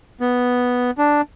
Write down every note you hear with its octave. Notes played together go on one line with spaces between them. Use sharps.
B3
D4